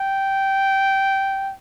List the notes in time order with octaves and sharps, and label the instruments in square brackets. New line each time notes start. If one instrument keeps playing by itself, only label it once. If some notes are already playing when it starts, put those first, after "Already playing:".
Already playing: [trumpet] G5